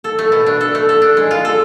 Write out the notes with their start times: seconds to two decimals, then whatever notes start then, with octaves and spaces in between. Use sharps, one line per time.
0.04 A4
0.19 A3
0.32 B2
0.46 D4
0.61 A4
0.75 A3
0.89 A4
1.02 D4
1.17 G#3
1.31 F4
1.45 A4